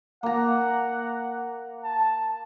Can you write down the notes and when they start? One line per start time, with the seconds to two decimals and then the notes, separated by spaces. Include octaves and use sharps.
0.23 A#3 F#5 A#5
1.84 A5